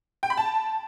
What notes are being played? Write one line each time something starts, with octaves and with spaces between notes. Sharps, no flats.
G5
B5
A5